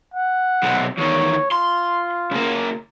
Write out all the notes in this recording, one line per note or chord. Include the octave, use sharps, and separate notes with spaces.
F#5
B1 C3
E2 D#3 C#5
F4 C6
C#3 A#3